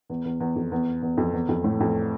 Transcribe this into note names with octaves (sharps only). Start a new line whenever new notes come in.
E2
E2
E2
F2
E2
E2
F2
E2
F2
A2
F2